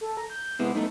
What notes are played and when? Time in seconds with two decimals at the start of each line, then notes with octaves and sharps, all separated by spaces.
0.01 A4
0.17 A#5
0.30 G6
0.59 C3 G#3 B3 E4
0.75 F#2 A3 B3 D#4